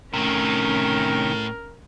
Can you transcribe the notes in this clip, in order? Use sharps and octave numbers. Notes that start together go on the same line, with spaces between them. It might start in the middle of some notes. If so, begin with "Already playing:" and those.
A2 C3 D#3 C#4 A#4